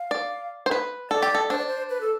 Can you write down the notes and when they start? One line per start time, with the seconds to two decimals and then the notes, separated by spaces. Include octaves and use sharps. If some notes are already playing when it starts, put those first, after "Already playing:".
Already playing: F5
0.11 D5
0.66 C5
0.71 B4
1.11 A4 D5
1.22 G4
1.35 A4
1.50 D4 C5
1.58 D5
1.67 C5
1.90 B4
2.01 A4